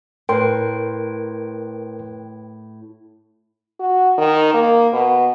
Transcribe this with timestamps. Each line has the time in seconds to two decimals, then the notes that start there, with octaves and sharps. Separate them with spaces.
0.29 A2 A#4 B4 G5 C6
3.80 F#4
4.18 D#3
4.54 A#3
4.93 B2